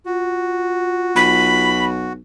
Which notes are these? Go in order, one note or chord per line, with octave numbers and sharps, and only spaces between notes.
F4 F#4
B1 B5